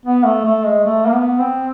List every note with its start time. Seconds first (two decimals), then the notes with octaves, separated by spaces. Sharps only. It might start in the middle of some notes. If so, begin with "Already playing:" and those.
0.05 B3
0.25 A3
0.45 A3
0.66 G#3
0.86 A3
1.06 A#3
1.12 B3
1.39 C4